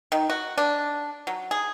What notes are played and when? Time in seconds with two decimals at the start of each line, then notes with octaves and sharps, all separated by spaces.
0.12 D#3
0.30 F#4
0.58 D4
1.27 F#3
1.51 G#4